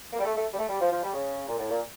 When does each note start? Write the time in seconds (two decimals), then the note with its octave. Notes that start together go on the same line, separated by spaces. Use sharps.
0.13 A#3
0.19 G3
0.25 A3
0.36 A3
0.54 G3
0.58 A3
0.69 G3
0.81 F3
0.91 F3
1.03 G3
1.14 C#3
1.48 A#2
1.59 A2
1.70 A#2